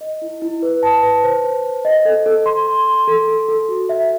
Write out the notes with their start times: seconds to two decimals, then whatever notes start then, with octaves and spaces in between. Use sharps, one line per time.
0.01 D#5
0.22 E4
0.42 E4
0.62 B4
0.83 A5
1.03 B4
1.24 C5
1.44 C5
1.64 C5
1.85 D#5
2.05 A4
2.26 A4
2.46 C6
2.67 C6
2.87 C6
3.08 A4
3.28 A4
3.48 A4
3.69 F#4
3.89 E5